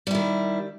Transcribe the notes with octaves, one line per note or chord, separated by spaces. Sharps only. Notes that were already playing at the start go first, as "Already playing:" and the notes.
D#3 G3 E4